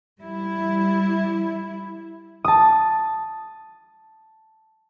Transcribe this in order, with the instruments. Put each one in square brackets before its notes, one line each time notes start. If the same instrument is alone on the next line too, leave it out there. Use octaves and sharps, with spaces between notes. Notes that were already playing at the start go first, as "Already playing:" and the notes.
[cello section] G3 E4
[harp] A5 D#6